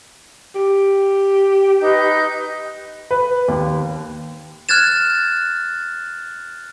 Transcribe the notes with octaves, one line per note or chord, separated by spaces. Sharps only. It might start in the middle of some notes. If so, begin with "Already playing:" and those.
G4
D#4 B4 G6
B4
D#2
F6 F#6 G#6 A6 E7